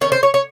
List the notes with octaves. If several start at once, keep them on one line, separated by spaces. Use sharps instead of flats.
D#3 A#3 C#4 C#5
C5
C#5
C#5